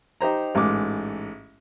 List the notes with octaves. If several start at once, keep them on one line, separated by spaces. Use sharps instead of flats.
D#4 G4 C5 A#5
A1 G#2 D6